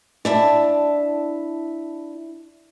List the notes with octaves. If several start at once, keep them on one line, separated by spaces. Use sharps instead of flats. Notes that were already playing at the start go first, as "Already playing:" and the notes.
D4 E4 A5